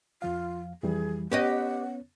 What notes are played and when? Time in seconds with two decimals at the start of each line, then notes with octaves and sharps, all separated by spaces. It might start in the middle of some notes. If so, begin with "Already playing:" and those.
0.22 F2 F3 F4 F5
0.83 F2 E3 G3 G#4
1.32 B3 C#4 G4 B4 C#5 D#5 F#5